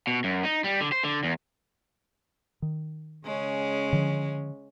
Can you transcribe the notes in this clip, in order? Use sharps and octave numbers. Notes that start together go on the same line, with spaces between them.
B2
F#2
D#4
G3
D3
C5
D3
E2
D#3
C#3 G#3 C#4
D3 F3